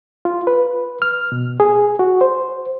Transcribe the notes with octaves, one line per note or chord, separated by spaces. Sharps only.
F4
B4
F6
B2
G#4
F#4
C5